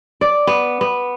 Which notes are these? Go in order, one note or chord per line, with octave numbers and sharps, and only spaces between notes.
D5
B3
B3